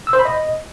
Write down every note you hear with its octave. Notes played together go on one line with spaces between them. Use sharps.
E6
C5
B5
D#5